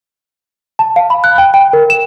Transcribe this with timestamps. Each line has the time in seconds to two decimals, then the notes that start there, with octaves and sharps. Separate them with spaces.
0.79 A5
0.96 F5
1.10 B5
1.24 F#6
1.38 G5
1.54 G5
1.73 A#4
1.90 E7